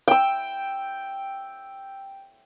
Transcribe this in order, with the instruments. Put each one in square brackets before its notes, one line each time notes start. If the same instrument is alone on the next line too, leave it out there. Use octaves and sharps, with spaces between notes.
[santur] G5 E6